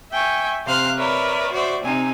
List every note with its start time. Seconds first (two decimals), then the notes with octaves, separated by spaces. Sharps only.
0.11 E5 G5 G#5 C#6
0.65 C3 C5 F5 C6 F6 F#6
0.96 A#4 B4 C#5 D5 E5
1.52 F#4 C5 D5 E5
1.82 C3 C4 D#4 G#5